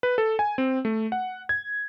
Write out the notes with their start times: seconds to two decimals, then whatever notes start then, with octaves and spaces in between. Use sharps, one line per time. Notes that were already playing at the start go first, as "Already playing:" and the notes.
0.03 B4
0.18 A4
0.39 G#5
0.58 C4
0.85 A3
1.12 F#5
1.49 G#6